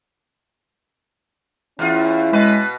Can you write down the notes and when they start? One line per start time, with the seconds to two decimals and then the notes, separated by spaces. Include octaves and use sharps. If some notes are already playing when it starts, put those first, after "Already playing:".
1.79 E2 C#4 E4 F4
2.33 B2 G#3 B4